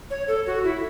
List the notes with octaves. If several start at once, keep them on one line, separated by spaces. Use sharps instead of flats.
C#5
A4
F#4
E4